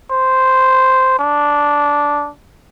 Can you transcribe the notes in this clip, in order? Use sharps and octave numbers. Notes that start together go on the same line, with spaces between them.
C5
D4